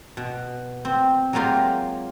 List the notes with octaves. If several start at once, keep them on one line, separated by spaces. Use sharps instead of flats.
B2
C4
F#3 G#3 A#3 F4 G4